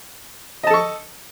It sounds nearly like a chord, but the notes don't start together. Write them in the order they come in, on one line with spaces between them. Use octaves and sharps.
D#5 A5 A4 C#6